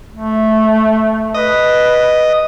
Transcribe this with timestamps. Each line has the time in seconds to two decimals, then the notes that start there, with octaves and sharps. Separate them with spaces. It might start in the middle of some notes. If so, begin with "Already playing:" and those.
0.14 A3
1.34 B4 D#5